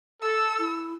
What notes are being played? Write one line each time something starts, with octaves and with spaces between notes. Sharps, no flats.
A4 E6
E4